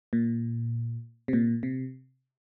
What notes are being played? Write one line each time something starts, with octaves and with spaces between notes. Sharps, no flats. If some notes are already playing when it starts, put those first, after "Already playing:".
A#2
C3
A#2
C3